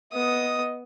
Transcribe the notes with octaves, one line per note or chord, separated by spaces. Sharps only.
B3 D#5 D#6